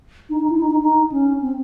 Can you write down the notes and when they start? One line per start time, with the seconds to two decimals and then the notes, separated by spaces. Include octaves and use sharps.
0.30 D#4
0.40 D#4
0.50 E4
0.60 D#4
0.70 D#4
0.80 D#4
1.12 C#4
1.42 C4